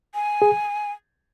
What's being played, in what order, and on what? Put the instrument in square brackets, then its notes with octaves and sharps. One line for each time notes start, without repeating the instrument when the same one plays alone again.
[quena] G#5
[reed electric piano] G#4